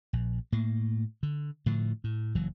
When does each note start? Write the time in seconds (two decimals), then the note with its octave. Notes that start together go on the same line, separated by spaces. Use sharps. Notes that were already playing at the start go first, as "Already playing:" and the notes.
0.13 A#1
0.52 A2 A#3
1.23 D3
1.66 A2 D3 F3
2.04 A2
2.35 F#1 E3 F#3